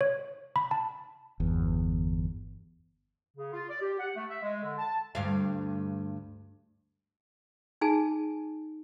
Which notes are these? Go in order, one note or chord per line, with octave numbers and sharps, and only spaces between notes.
C#5
B5
A5
G1 E2
C#3
F4
D5
G4
F#5
A3
E5
G#3
D3
A5
D2 G2 F5
D#4 G#4 G#5 A5